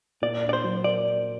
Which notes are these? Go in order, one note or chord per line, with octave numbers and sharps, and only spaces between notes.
A#2 D5
D4
D5
C5
F#3
A#3 D5